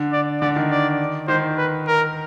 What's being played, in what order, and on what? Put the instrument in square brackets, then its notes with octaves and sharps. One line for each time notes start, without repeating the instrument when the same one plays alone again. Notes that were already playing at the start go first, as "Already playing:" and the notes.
Already playing: [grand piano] D3
[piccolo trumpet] D5
[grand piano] D3 [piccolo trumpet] D5
[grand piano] D#3
[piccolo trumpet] D5
[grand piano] D#3 [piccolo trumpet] C5
[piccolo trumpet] B4
A#4